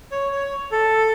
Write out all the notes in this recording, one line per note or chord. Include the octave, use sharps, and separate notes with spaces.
C#5
C#5
A4